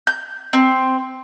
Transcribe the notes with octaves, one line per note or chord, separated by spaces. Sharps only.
G6
C4